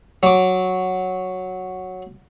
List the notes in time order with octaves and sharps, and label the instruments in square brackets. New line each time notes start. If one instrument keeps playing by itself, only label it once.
[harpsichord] F#3 D6